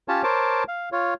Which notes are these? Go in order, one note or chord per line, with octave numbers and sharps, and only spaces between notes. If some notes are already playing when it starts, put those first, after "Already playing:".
C#4 F4 G4 C#5 A5
A#4 C5 C#5 A5 D6
F5
F4 C#5